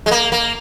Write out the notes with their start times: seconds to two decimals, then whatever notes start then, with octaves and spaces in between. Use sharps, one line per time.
0.06 G#3
0.11 A#3
0.32 A#3